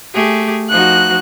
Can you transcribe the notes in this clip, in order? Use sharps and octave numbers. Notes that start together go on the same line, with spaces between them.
A3 G4 G#4
F3 D#4 F#4 F#6